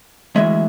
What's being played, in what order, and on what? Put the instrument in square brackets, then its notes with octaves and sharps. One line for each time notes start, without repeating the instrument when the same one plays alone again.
[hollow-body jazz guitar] D2 C#3 E3 G#3 E5